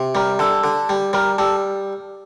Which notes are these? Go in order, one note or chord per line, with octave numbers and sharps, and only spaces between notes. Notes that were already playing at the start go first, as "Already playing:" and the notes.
Already playing: C3
G3 A#4
D3 A4
D3
G3
G3 A#4
G3 A4